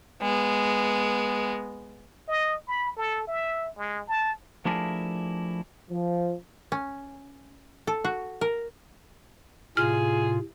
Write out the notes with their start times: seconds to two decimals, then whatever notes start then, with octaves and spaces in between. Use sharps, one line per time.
0.22 G#3 B3
2.28 D#5
2.67 B5
2.97 A4
3.27 E5
3.78 G#3
4.08 A5
4.65 F3 A3 D4 E4 G#4 A#4
5.90 F3
6.72 C#4
7.87 A4
8.05 F#4
8.41 A#4
9.77 A2 C3 F4 G#4 F6